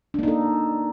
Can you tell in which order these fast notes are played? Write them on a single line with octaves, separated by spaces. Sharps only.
D4 A#3 D#4 A4